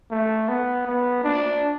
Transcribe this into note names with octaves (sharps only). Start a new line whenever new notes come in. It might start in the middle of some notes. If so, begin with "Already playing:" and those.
A3
B3
B3
D4